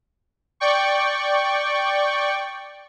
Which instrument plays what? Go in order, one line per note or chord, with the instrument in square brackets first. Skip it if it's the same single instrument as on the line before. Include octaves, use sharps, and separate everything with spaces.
[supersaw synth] D5 G5 C#6